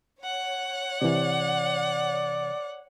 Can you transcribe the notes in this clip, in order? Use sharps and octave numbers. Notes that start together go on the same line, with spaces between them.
C#5 F#5
C3 E3 D5